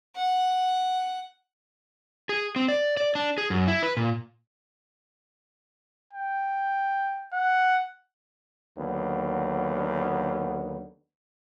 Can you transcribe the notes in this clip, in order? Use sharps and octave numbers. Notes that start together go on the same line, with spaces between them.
F#5
G#4
C4
D5
D5
D4
G#4
F#2
E4
B4
A#2
G5
F#5
D#2 D3 F#3 B3